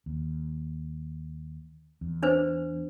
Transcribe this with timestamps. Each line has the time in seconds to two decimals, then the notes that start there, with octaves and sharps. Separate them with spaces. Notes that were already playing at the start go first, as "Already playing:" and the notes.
0.06 D#2
2.01 E2
2.23 D4 B4 C5